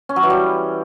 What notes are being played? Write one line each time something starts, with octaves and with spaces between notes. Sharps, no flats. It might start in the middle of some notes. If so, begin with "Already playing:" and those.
C#4
F#3
E3
G3